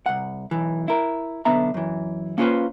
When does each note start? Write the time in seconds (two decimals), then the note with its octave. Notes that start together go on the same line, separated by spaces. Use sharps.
0.06 C2 F#5
0.51 B1 E3
0.88 E4 A#4
1.45 B1 D3 B3 E5 A#5
1.74 F#2 E3
2.38 A#3 C#4 F4 G#4 B4 C5